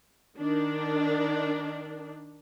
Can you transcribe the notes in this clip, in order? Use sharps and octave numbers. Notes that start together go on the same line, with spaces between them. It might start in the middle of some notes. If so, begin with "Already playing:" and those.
D#3 D4